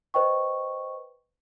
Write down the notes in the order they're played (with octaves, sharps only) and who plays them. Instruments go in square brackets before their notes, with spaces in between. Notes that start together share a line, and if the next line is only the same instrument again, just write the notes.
[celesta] B4 C5 D#5 G5 C#6